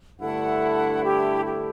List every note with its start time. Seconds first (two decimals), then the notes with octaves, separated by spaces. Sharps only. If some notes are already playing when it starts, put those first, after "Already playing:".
0.20 G2 D3 A3 E4 A4 F#5
1.03 G4
1.45 G4